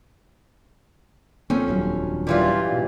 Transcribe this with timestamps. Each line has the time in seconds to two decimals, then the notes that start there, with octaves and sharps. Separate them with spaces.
1.50 F2 A#3 C4 C#4
1.68 D#1 G2 F#3
2.27 A#2 E3 G3 F4
2.67 G#2 B2